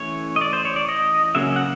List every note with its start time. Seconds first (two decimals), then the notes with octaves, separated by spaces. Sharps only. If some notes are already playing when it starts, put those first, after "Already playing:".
Already playing: E3 A3 C#4 C#5
0.36 D#5
0.41 D5
0.53 C5
0.65 C#5
0.76 D5
0.88 D#5
1.35 C#3 F#3 A#3 C#4 E5
1.56 F#5